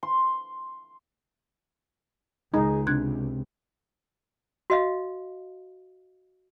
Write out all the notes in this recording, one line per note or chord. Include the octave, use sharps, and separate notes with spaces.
C6
C#2 G#3 D#4 G#4
C3 D4 F#6 G#6
F#4 D#5 F5